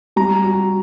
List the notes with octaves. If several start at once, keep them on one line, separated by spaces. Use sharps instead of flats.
G3 A#5
F#4